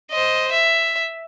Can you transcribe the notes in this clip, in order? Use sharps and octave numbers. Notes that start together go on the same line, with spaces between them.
C5 D#5
E5